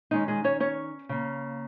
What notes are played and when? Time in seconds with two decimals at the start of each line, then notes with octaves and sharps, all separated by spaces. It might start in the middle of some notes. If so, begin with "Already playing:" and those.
0.11 D#3 G#3 C#4 D#4
0.28 G#3 G#4
0.44 C#4 C#5
0.60 C#4 C#5
1.09 C#3 A#3